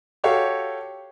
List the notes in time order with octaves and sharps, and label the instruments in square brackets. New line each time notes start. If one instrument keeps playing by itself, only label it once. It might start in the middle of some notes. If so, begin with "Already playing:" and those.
[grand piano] F#4 G4 A4 C#5 F5